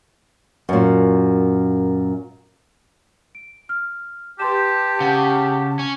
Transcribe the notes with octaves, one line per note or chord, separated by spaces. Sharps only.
F#2 A#2
D7
F6
G4 B4 A5 C6 E7
C#3 F#5
C#4